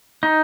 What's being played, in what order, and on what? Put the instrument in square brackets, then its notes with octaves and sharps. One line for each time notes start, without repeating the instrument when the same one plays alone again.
[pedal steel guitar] D#4